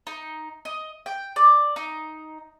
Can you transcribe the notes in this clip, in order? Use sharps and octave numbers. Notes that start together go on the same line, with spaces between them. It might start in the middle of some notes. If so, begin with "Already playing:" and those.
D#4
D#5
G5
D5
D#4